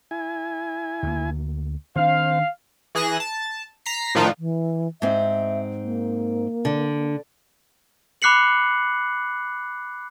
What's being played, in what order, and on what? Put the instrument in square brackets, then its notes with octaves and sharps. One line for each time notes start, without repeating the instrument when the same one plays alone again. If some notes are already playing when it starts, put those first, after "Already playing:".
[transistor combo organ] E4 G#5
[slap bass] D2 A#3
[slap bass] D#3 D4 [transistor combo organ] C4 C5 [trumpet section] F5
[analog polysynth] E3 G#4 F#6 A#6 E7
A5
A#5 B6 C7
A2 D#3 F3 D4 D#4 F4
[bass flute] E3
[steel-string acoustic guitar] G#2 C4 [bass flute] E5
[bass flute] A#3
[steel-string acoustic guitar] D3
[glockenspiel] B5 D6 F#6 C7 C#7 F#7